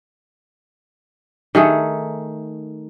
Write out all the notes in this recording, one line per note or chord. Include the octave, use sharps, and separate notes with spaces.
D#3 A3 G#4